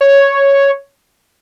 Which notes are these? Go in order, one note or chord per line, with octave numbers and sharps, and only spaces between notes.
C#5